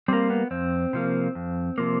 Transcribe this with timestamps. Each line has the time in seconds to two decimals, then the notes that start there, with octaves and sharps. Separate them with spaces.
0.08 G3 A#3 C4
0.30 B3
0.51 F2 C4
0.93 C3 F3 A#3
1.35 F2
1.78 C3 F3 A#3